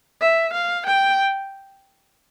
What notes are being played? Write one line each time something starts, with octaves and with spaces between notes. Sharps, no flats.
E5
F5
G5